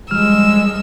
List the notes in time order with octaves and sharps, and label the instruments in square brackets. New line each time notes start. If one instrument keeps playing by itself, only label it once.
[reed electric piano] F3 G3 F6 [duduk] G#3 [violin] E6